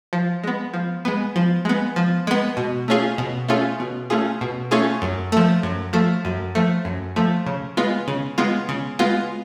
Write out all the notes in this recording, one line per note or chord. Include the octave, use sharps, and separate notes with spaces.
F3
G#3 B3
F3
G#3 B3
F3
G#3 B3
F3
G#3 B3
B2
A3 C#4 F4 G#4
B2
A3 C#4 F4 G#4
B2
A3 C#4 F4 G#4
B2
A3 C#4 F4 G#4
F#2
F3 A3
F#2
F3 A3
F#2
F3 A3
F#2
F3 A3
C#3
G#3 B3 F4
C#3
G#3 B3 F4
C#3
G#3 B3 F4